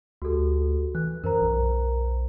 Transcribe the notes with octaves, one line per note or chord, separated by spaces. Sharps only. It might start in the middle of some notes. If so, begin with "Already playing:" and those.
D2 F#4 G4 A4
E3 F#6
F#2 A#4 C5 A#5
B1